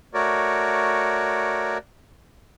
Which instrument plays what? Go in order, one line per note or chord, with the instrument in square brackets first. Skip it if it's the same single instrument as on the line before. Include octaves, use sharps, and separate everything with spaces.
[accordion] A3 F#4 A#4 C#5 D5